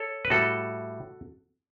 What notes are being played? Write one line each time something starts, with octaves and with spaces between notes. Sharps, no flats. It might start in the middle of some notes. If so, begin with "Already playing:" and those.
Already playing: A4 C#5
B4
A2 G3 F#4 A4